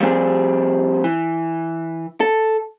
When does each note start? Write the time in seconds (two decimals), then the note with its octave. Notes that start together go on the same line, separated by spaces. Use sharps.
0.01 F3 G3 C4 G4 G#4
1.04 E3
2.20 A4